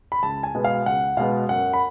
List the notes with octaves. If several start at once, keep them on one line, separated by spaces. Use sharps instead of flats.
B5
C#2 A5
G#5
B2 G#3 B3
F5
C#2 F#5
B2 G#3 B3 F5
F#2 F#5
B5